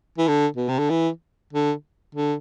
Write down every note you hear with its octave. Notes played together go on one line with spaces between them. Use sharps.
E3
D3
B2
C3
D3
E3
D3
D3